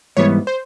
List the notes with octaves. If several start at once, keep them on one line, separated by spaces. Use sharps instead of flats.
G#2 E3 G3 B3 C#5
C5